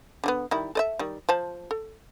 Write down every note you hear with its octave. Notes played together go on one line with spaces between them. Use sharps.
D3 G3 B3
D#3 G3 E4
A4 D#5 E5
D#3 G3
F3 C5 A5
A4